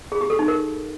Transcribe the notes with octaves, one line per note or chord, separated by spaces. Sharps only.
G#4
G4
A4
D#4
A#4